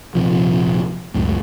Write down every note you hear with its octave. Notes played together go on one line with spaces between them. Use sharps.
D#1 C3 F3
C#2 F#2 A2